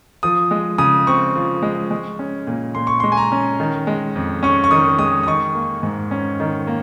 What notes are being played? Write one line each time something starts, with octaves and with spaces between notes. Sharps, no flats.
F3 D#6
G#3
C#3 D#6
C4 C#6
F3
G#3
G#3
C#4
A#2
A#2 C6
C#6
G#3 C6
G#5
A#5
C#4
D#3
G#3
F2
C#4 C#6
C#6
D#3 D#6
G#3 D#6
D#6
D#3 C#6
A#3
G#2
C#4
D#3
A#3